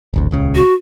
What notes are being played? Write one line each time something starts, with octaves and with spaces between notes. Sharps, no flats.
D1 G#1 D2
D#1 C#2 C#3
F#4